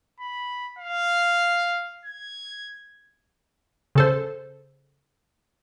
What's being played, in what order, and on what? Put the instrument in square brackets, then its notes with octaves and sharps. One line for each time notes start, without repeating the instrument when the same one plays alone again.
[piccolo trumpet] B5
F5
G#6
[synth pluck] C#3 A4 C5